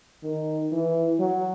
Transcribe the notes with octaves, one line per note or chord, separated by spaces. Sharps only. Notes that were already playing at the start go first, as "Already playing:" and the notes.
D#3
E3
F#3